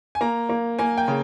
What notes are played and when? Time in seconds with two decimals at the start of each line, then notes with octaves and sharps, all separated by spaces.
0.15 G#5
0.21 A#3 A#5
0.49 A#3
0.79 A#3 G#5
0.98 G5
1.08 C#3